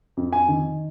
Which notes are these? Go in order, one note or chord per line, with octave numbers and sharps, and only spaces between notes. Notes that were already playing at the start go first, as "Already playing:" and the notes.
F2
G#5
D#3